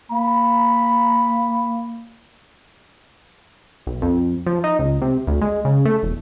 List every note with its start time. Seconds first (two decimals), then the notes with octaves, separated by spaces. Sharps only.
0.11 A#3 B5
3.87 B1
4.02 F2
4.47 F3
4.64 D#4
4.79 C#2
5.02 C3
5.27 D2
5.42 G#3
5.65 C#3
5.85 A3
6.03 E1